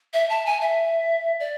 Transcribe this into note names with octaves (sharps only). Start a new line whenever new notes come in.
E5
A5
G#5
E5
D5